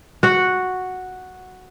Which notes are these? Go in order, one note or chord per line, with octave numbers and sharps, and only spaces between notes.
F#4 F#5